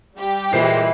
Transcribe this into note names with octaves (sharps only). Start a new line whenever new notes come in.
G3 G4
A#2 E3 G#3 C5 C7